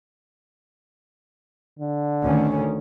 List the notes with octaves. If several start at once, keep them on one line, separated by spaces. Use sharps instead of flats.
D3
D2 D#3 C#4